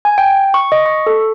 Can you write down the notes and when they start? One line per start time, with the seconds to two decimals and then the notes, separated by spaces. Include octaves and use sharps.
0.05 G#5
0.18 G5
0.54 C#6
0.72 D#5
0.86 C#6
1.07 A4